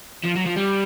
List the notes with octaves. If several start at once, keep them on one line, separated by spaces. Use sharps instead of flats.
F3
F#3
F3
G3